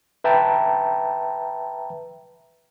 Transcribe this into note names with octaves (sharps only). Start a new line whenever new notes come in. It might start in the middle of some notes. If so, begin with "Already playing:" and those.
B4 E5 G5 A5 A#5